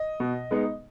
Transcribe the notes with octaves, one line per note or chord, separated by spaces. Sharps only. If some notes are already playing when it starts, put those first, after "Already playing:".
Already playing: D#5
B2
G#3 B3 D#4